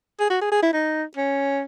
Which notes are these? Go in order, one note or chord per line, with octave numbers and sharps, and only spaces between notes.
G#4
F#4
G#4
G#4
E4
D#4
C#4